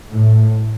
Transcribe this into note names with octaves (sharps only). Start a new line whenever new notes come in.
A2